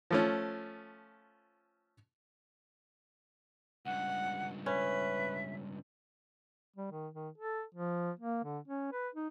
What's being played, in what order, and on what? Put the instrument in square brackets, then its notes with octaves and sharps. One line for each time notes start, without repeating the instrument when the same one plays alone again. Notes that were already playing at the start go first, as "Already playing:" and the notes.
[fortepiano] F3 A3 C#4
[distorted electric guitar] C#2 G2 [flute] F#5
[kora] C#4 [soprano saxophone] B4 [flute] E5
[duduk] G3
D#3
D#3
A4
F3
A#3
D3
C#4
B4
D#4